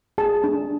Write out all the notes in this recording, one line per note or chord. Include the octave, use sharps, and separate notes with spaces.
G#4 A5
D4